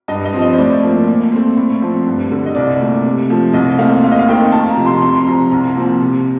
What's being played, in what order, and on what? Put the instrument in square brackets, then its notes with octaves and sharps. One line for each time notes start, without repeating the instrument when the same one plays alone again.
[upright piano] G2 D#5
D#5
F3 C4
D#5
C5
A2 D5
F3 A#3
A#2
A3 C4
A2
F3 C4
G2
D3 G3
D#5
C2 D5
A#2 A3
C3
F3 A3
C2 D#5
A#2 A3 C4 F5
D#2 F5
D#5
F5
D#3 A3 C4 G5
F2 A5
A#5
C3 F3
C6
F2 C6
C6
C3 F3 A#5
C2 A#5
A#2 F3 C4
C3